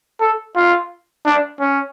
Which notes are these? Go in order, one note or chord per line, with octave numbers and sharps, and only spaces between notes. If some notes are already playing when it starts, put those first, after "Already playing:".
A4
F4
D4
C#4